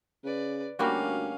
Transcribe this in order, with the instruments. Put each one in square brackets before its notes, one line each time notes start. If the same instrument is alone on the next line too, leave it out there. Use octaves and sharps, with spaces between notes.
[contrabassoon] C#3 [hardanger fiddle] B4 D5
[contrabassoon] D2 [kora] G3 A#3 F#4 [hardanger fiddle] C#4 F5